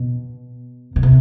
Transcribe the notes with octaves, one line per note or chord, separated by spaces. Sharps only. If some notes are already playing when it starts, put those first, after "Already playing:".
Already playing: B2
B2
C3